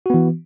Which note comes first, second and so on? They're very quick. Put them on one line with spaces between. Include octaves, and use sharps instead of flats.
F#4 B3 E3